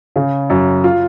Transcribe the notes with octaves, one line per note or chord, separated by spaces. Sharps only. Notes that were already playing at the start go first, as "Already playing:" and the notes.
C#3
F#2
F4